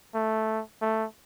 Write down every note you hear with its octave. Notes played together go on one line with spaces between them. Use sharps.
A3
A3